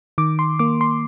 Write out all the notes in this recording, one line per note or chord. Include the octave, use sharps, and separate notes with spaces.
D#3 D6
C6
A#3 D6
C6